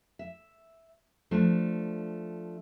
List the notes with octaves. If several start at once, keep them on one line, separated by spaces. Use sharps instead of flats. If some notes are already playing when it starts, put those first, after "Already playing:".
E5
F3 A3 D4